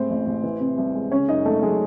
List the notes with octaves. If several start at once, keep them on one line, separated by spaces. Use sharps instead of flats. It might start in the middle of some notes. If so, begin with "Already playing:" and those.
Already playing: A2 G#3 C4 C5
A1
A1
E3
C3
C2
G#3
C#3 C#4 C#5
F#2 D#4 D#5
G#1 A3 A4
F#3 G#3 G#4